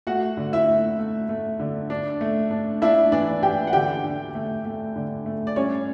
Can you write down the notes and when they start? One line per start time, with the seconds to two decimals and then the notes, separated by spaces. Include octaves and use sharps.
0.07 A3 F#4 F#5
0.37 D3
0.53 E4 E5
0.68 A3
0.99 A3
1.29 A3
1.59 D3
1.90 D4
2.21 A3
2.51 D4
2.82 D4 E4 E5
3.12 E3 D4 D5
3.43 E3 G4 G5
3.67 F#5
3.73 D3 G4 G5
4.04 D3
4.35 A3
4.65 A3
4.96 D3
5.26 A3
5.47 D5
5.56 G3 C#4 C#5